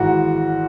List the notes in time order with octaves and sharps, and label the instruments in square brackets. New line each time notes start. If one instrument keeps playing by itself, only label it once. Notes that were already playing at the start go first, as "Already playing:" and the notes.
Already playing: [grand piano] G#1 G#2 E3 F#4